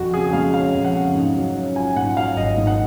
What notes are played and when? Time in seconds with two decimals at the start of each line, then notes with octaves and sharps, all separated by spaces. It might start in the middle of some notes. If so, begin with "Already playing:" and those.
Already playing: F2 F#4
0.13 C#3 G#4
0.33 G#3 F5
0.54 C#4 F5
0.74 F2
0.84 F#5
0.94 C#3
1.15 G#2
1.35 F#3
1.55 C#4
1.76 F4 G#5
1.96 G#2 F#5
2.16 F#3 F5
2.36 G#1 D#5
2.57 G#2
2.67 F#5